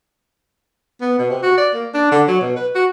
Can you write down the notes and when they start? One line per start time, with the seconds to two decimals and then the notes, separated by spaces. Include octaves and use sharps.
1.01 B3
1.19 B2
1.31 C3
1.43 F#4
1.58 D5
1.74 A#3
1.94 D4
2.11 D3
2.28 F#3
2.41 B2
2.56 B4
2.75 F#4